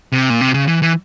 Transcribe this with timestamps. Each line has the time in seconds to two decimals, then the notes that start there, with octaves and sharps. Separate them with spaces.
0.12 C3
0.30 A#2
0.41 C3
0.54 C#3
0.68 E3
0.82 E3